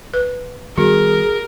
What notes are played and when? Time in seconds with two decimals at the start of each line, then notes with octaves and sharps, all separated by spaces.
0.14 B4
0.78 D#3 G3 B3 F#4 G#4 A#4